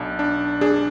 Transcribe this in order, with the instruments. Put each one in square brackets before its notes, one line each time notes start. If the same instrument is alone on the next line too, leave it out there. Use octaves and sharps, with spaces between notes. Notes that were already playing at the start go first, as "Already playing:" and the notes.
Already playing: [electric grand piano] B1 D4
D4
[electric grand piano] D4 [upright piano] G#4